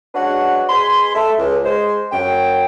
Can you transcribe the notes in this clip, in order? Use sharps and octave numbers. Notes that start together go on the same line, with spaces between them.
G#3 C#4 D4 F#4 B4 F#5
B2 G#4 B5 C6
A4 E5
C#2
G#3 C5
F#2 G5